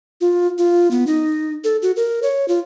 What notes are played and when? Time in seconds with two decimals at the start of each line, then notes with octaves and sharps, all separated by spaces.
0.21 F4
0.58 F4
0.91 B3
1.07 D#4
1.64 A4
1.82 F#4
1.97 A#4
2.23 C#5
2.48 F4